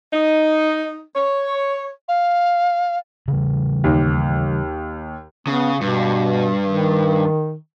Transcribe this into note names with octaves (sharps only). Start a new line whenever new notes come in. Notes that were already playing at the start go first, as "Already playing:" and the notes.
D#4
C#5
F5
C#3 E3 G3
D#2
C#3 B3
G2 B2
D#3